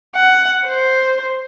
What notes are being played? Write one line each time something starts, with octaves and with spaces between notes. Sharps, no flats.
F#5
C5